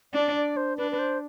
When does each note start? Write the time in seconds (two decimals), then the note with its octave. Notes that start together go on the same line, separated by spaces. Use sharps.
0.14 D4 D5
0.36 D5
0.57 C5
0.78 D4 B4
0.92 B4
0.99 C5